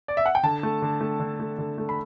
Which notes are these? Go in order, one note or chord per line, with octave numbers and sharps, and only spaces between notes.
D5
E5
F#5
G5
D3 A5
A3
D3
A3
D3
A3
D3
A3
B5